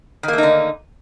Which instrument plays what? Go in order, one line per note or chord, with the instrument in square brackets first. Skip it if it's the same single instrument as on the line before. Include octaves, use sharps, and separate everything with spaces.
[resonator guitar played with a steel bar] D#3
A#3
A3
D#4
D3